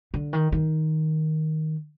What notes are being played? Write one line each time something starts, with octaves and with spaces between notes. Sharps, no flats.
D3
D#3
D#3